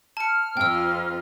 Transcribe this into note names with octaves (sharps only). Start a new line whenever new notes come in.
A5 F6 C#7
F2 C4 F4 G5 E6